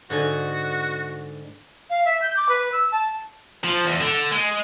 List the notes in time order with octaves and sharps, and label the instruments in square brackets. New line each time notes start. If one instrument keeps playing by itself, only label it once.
[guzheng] G#2 D3 G#5 [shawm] F#4
[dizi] F5
E5
G6
D6
B4
E6
A5
[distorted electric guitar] F3
E2
D3
G#3